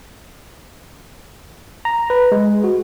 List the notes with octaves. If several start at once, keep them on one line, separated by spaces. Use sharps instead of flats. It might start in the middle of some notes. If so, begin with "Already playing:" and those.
A#5
B4
G#3
F#4